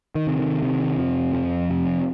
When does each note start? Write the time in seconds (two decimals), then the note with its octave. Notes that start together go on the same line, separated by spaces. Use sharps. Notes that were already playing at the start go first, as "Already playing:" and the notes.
0.15 D#3
0.27 C3
0.39 D#3
0.62 C3 D#3
0.98 F2 F3
1.33 F2 F3
1.70 C3